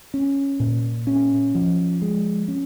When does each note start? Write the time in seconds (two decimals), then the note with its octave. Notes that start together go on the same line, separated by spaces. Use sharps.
0.14 C#4
0.60 A#2
1.07 C#4
1.55 F3
2.02 G#3
2.48 C#4